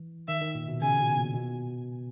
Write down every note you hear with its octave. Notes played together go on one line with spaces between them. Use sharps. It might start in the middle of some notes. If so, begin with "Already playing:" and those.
Already playing: E3
D#3 E5
D#3
A#2
B2
C#3 G#5
B2
A#2
B2